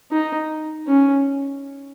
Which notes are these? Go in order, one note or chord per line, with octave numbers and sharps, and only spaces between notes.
D#4
C#4